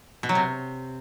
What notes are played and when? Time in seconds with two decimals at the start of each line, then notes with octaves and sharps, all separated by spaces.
0.23 B2
0.29 F#3
0.35 C3